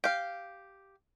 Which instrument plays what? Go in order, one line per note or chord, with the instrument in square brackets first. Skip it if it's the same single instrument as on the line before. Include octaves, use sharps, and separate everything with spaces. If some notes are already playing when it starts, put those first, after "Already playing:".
[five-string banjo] G4 F5